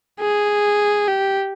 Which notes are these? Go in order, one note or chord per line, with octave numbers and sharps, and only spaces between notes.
G#4
G4